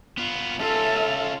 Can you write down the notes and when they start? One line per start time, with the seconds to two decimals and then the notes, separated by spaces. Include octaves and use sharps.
0.18 B3 F4
0.60 C#4 F4 A4 E5